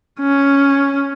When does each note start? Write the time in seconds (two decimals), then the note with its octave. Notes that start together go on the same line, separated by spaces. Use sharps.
0.20 C#4